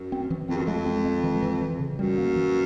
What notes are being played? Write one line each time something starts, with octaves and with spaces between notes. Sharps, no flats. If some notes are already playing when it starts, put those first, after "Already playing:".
Already playing: F#2
C4
E3
F2 C4
F#2
F2 G#3
C4
G#3
E3
E3
E3
C#3
F#2 G3
A#3
E3